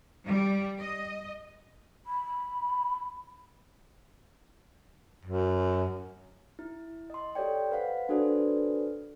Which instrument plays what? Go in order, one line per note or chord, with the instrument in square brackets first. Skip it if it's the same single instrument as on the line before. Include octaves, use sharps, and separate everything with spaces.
[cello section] G3
D#5
[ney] B5
[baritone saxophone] F#2
[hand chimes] E4
D#5 C6
G4 A4 C#5 D5 G5
B4 C5 F5 F#5
D4 F#4 A4 B4 C5 D5